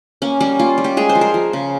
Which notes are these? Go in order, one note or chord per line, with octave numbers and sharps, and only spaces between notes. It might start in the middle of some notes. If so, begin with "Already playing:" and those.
A#3 C#4
G3 C#4
A#3 F4
G3
G4
G#3 G#4
C5
F3
A#4
F3
C#3